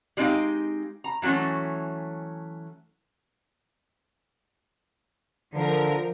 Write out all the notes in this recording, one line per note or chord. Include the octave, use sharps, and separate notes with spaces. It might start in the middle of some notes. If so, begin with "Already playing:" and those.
G3 G#3 C4 D#4 G4 F5
A#5
E3 F#3 A3 C#4
D3 F3 A#4